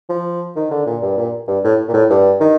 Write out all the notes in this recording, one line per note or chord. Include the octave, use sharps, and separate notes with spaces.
F3
D#3
D3
A#2
G2
A#2
G2
A2
A#2
A2
G2
D#3